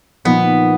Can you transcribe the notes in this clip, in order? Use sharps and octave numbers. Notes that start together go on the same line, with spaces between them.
A#2 F3 A#3 B3 D#4